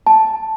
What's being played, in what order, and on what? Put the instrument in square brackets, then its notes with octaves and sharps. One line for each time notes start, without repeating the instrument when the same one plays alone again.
[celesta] A5